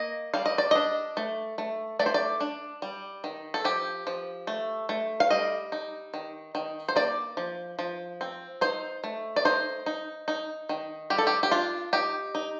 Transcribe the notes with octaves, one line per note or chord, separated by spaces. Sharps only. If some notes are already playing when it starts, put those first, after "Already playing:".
Already playing: A#3 D#5
G3 F5
D#5
D5
D4 D#5
A3
A3
A3 D5
C5
D5
D4
G3
D#3
A4
F3 G4
F3
A3
A3
F5
G3 D#5
D#4
D#3
D#3
C5
A#3 D5
F3
F3
C4
D#4 C5
A3
D5
D#4 C5
D#4
D#4
D#3
G3 G4
A4
G4
G4
D4 F4
D#4 G4
D#4